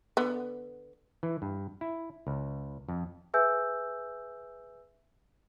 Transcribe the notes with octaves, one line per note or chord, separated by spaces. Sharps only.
D3 B3
E3
G2
E4
C#2
F2
G#4 B4 E5 G#5 E6 G6